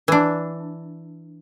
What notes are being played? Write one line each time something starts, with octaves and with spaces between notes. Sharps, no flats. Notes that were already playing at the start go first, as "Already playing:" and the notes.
E3 D4